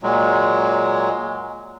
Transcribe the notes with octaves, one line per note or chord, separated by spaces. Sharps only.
A#2 F#3 G#3